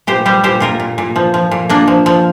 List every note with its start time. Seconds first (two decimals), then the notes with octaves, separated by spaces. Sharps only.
0.07 A#2 G4 C5
0.26 G3 G4 C5
0.44 A#2 G4 C5
0.60 A#2 F4 A#4
0.80 A#2
0.98 A#2
1.16 F3
1.34 F3
1.51 A#2
1.69 A#2 A#3 D4
1.88 F3
2.06 F3